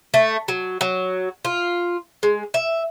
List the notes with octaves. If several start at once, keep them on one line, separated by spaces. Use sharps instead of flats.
A3
F#3
F#3
F4
G#3
E5